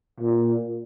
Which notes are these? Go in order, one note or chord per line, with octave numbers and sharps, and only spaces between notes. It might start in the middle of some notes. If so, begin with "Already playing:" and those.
A#2